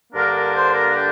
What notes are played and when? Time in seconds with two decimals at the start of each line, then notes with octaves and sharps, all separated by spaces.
0.12 G2 D3 A#3 D4 A#4
0.33 A#4
0.54 C5
0.75 A#4
0.95 G4